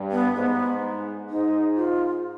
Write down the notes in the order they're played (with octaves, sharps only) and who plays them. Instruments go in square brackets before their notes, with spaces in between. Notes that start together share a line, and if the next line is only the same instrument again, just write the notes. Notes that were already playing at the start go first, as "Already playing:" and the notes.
Already playing: [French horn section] G2
[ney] B3
[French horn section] G#2 [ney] B3
[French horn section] G#2 [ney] D#4
[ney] F4